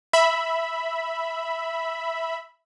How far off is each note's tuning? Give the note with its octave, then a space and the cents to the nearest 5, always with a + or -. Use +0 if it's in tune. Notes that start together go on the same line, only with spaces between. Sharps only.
E5 +0 B5 +0